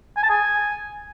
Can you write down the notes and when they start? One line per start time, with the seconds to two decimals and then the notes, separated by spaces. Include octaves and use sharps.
0.17 G#5
0.23 A5
0.30 G#5